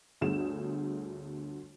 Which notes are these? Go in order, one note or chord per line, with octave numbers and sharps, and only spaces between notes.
G1 D2 D3 G#4 E7